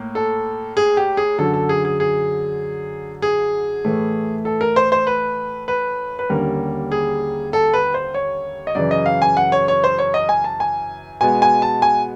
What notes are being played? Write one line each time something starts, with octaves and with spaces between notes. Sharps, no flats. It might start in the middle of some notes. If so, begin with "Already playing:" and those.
Already playing: A2 A#3
A4
G#4
G4
G#4
F#2 D3 F#3 A4
A4
G#4
G#4
G#4
G#4
A2 E3 A3
A4
A#4
C5
C5
B4
B4
B4
D#2 D3 G3 A#3 C#4 A#4
G#4
A4
B4
C5
C#5
D#5
F#2 C#3 E3 D5
D#5
F5
G#5
F#5
C#5
C#5
C5
C#5
D#5
G#5
A5
G#5
B2 G#3 B3 G#5
G#5
A5
G#5